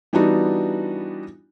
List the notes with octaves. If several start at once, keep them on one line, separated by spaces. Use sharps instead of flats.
E3 G3 B3 D4 D#4 F#4